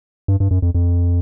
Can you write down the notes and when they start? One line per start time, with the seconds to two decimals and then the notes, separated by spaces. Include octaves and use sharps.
0.28 G2
0.40 G2
0.51 F#2
0.62 F2
0.75 F2